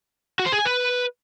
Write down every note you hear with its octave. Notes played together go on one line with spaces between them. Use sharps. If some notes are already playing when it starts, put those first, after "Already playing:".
F#4
C5
G#4
G#5
B4